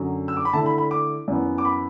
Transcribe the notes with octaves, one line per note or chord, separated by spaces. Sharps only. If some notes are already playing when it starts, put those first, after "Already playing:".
Already playing: F#2 D3 F#3
E6
D6
B5
D3 A3 E4 A5
B5
B5
D6
F#2 E3 B3
D6
B5